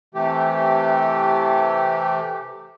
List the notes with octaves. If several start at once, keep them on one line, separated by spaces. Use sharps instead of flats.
C3 E3 A3 G4